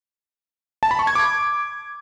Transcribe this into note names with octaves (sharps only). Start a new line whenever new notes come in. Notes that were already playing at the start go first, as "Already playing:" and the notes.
A5
B5
C#6
G#6
D6